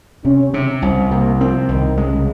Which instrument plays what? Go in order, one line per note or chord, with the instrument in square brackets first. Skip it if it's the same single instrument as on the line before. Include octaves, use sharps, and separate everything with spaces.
[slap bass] C3 [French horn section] C#4
[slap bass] C3 [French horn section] C#4
[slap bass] C2 [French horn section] C4
[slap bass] C3 [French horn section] A#3
[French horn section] F3 [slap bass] C4
[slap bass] C2 [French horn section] D#3
[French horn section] C#3 [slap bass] G#3